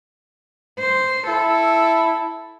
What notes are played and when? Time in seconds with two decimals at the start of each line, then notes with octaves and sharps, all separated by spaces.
0.79 C5
1.28 E4 A4